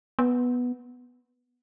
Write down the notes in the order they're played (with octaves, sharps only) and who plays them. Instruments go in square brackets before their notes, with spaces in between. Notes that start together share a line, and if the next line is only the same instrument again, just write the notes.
[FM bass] B3